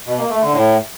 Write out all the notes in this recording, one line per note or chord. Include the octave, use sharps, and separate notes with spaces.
B2
A#3
A3
D3
A2